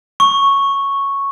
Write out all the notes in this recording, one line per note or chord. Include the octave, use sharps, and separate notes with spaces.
C#6